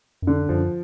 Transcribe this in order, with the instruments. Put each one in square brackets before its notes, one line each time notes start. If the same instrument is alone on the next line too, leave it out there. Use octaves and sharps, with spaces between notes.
[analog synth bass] F#2
[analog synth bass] F2 [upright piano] D3
[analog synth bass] F#2 [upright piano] F3